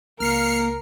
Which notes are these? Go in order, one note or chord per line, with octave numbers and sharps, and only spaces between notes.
C#2 A#3 A#4 F6 C7 C#7